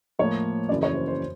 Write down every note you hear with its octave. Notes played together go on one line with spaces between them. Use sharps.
A2 F3 A#3 C#5
F#2 C#3 E3 D5
C#5
C5
C5